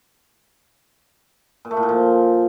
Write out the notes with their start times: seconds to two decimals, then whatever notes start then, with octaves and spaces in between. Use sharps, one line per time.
1.65 A#2
1.71 A3
1.77 A2
1.83 A#2
1.89 F3